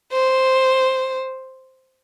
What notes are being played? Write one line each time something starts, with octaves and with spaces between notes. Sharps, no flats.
C5